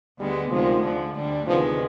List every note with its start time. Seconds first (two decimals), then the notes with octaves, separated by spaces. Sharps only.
0.19 D2 D3 G3 G#3 B3
0.51 D2 C3 D#3 F3 G#3
0.83 D2 D3 F3
1.14 D2 D3 G3 D4
1.46 D2 C3 D#3 F3 G#3 B3